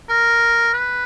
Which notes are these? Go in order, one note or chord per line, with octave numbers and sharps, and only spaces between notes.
A#4
B4